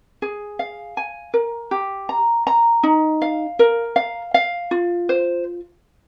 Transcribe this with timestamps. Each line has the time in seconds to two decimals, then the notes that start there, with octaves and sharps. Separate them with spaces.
0.22 G#4
0.59 F5
0.97 G#5
1.34 A#4
1.71 G4
2.09 A#5
2.47 A#5
2.83 D#4
3.22 F5
3.59 A#4
3.96 F5
4.34 F5
4.71 F4
5.09 C5